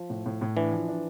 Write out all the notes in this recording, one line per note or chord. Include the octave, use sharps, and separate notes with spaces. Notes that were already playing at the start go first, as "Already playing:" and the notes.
Already playing: F3
A2
A2
A2
E3 D4
F3
D4